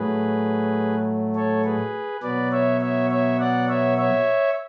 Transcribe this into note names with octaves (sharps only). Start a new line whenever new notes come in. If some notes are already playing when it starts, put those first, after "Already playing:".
Already playing: A2 F#3 A3 G#4 B4
A4 C#5
G#4 B4
B2 F#3 B3 B4 D5
C#5 E5
C#5 E5
C#5 E5
D5 F#5
C#5 E5
C#5 E5